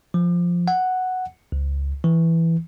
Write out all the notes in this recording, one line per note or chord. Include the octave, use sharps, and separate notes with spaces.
F3
F#5
C#2
E3